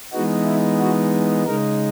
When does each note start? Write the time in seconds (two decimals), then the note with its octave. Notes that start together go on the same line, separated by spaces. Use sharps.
0.12 E3 G#3 B3 D#4 F#4
0.46 E4
0.80 F#4
1.46 C#3 G#3 D#4 A#4